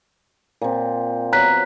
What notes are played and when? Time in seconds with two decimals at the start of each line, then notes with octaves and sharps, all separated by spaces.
0.61 A#2 C4
1.33 F#3 B3 A#4 A#5 F#6 B6